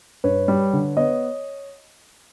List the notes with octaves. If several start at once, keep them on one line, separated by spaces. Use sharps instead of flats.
G2 B4 C#5
G3
D3
B3 C#5 D#5